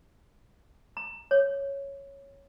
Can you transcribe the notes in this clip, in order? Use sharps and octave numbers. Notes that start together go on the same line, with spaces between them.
A#5
C#5